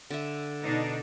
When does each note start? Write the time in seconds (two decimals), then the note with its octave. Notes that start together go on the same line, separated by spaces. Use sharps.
0.10 D3 E5
0.62 B2 D4 D#4